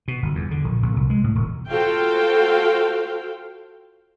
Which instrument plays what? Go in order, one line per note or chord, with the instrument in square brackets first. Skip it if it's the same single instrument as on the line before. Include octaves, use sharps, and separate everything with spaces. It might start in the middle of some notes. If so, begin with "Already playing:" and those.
[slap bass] B2
G1
E2
D3
A#1
A#1
C2
G#3
A2
E1
[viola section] F4 F#4 A4 C5 F5 G5